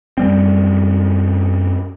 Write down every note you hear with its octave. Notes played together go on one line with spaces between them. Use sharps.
F#2 G3 C4